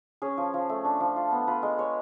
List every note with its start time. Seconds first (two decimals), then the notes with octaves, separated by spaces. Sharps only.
0.22 C#4 G#4
0.37 F3
0.54 F3
0.69 A3
0.85 D4
1.00 F3
1.16 F4
1.32 B3
1.47 F4 B4
1.63 G#3
1.78 G#3 C#5